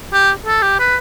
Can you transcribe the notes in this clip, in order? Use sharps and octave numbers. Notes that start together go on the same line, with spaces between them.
G4
A4
G4
B4